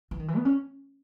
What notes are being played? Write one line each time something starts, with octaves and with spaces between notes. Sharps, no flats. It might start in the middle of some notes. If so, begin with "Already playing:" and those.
E3
D#3
E3
B3
C#4